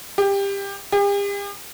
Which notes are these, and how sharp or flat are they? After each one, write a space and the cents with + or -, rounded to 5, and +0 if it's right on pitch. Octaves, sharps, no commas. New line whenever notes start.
G4 +20
G4 +45